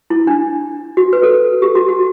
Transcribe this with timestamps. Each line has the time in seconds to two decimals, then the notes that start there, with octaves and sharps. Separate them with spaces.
0.10 E4
0.27 D4
0.97 F#4
1.13 B4
1.23 A4
1.62 G4
1.75 F#4
1.89 F#4